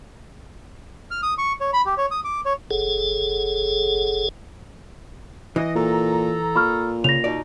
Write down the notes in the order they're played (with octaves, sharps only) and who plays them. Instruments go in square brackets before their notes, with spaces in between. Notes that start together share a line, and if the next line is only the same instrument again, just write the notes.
[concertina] F6
D#6
C#6
C#5
B5
G4
C#5
D#6
D6
C#5
[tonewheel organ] F#1 G#4 A4
[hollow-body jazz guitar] E3 [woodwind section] D#5
[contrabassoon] A#2 [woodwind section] A4 A#5
[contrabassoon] A#2 [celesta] B5 C#6 F6
[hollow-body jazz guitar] C#3 [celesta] A#6 F7
[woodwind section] B2 D#4 [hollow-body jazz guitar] D5